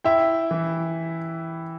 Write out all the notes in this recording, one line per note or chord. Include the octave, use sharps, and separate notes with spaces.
E4 E5 G5
E3